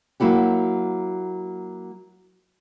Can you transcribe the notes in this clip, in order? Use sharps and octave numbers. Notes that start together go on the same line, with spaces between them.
F#3 A#3 E4 F#4 G4